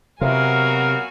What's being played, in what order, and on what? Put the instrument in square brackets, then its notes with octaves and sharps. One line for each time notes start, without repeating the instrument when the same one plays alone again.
[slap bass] C3 [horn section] F#3 B3 F5 [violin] F#4 G#5 [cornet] A#4